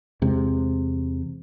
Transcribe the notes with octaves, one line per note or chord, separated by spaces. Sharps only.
E2 C3 G#3